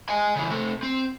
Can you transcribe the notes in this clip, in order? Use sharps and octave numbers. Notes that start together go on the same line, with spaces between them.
D#5 G#5
C#3 E3
C3 A3
C4